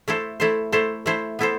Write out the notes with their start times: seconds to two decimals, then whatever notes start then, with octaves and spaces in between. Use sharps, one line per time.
0.08 A3 E4 A4 C5
0.40 A3 E4 A4 C5
0.72 A3 E4 A4 C5
1.06 A3 E4 A4 C5
1.39 B3 E4 A4 C5